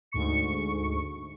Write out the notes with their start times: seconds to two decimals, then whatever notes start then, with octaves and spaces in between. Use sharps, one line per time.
0.12 D2 G#2 C#6 C#7